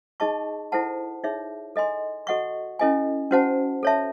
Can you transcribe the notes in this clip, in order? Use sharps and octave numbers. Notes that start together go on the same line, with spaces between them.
D#4 G#4 D#5 A5 C#6
E4 A4 C5 F#5 A5
D#4 G#4 C#5 E5
A4 D#5 G#5 C6
F#4 A4 D#5 F#5 C#6
C#4 E4 A4 D#5 G#5
C#4 F#4 C5 F#5 A5
A4 C#5 E5 A5